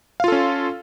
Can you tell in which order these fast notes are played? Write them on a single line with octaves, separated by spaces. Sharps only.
F5 F4 A4 C#4